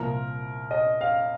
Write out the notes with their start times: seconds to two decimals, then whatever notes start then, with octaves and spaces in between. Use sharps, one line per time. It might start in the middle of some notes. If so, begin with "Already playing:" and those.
Already playing: C2 A#2 F3 A#4
0.71 D#5
1.01 F5